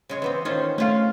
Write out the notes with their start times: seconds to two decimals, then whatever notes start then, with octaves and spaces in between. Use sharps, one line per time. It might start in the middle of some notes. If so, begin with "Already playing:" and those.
0.09 C#3 G#3 C#5
0.22 E3 B3 C4
0.45 D#3 C#4 D#4 F4 C5
0.78 A3 C#4 F4 F5